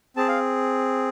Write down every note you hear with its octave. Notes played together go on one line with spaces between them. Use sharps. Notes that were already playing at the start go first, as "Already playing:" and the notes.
C4 G#4 A5
F5